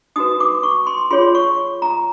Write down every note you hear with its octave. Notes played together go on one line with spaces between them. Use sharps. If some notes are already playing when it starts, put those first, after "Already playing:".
D#4 F#4 B4 D#6
D6
C#6
C6
F4 G#4 C#5 C6
C#6
A#5